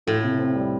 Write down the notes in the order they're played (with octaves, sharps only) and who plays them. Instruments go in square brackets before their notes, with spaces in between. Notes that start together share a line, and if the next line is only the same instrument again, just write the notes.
[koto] A2 [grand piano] F4
[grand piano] C3
C4
G3